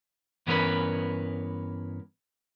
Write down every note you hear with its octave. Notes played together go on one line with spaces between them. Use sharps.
G2 E3 B3 C#4 A#4 B4